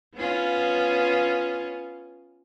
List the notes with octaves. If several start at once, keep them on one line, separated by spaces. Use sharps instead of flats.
B3 C#4 F4